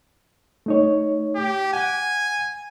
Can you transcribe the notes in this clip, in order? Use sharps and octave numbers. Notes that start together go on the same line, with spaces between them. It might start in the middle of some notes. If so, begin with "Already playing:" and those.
A3 D#4 C#5
G4
F#5 G#5